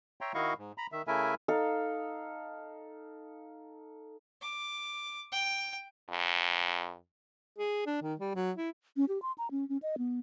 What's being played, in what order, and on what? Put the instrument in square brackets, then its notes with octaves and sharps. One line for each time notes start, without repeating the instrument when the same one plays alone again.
[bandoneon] C#5 E5 G5 A#5 C6
D#3 E4 F#4 D#5 F5 C#6
G#2
A#5 B5
D#3 E5
C#3 A3 E4 A#4 E5 G#5
[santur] D#4 A4 F5
[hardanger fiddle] D6
G5
[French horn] F2
[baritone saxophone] G#4
D4
D#3
G3
F#3
E4
[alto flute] C#4
G4
C6
A#5
C#4
C#4
D#5
B3